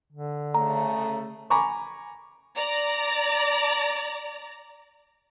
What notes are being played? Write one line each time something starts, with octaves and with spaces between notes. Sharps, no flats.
D3
C#3 A3 A#5
G#5 A#5 B5 C#6 D6
D5 A#5